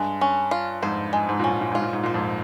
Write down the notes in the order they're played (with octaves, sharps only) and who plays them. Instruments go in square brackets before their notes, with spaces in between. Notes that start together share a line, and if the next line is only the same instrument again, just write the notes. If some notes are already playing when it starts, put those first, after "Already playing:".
Already playing: [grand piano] G2 [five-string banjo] G#3
[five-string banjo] C#4
F4
[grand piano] F2 G#2 [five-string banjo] C5
[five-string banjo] G#3
[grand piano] G#2
[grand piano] A#2 [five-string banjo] C#4
[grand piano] G#2
A#2
[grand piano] G#2 [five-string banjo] F4
[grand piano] A#2
G#2
[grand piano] A#2 [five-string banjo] C5
[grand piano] F2 G#2